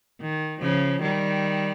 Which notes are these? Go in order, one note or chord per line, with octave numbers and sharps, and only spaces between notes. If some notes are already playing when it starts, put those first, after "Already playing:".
D#3
C#3 F3
D#3 G3